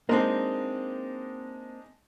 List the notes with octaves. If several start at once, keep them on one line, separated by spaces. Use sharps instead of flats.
G#3 A#3 C4 D4 D#4